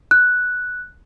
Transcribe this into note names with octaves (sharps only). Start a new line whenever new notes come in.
F#6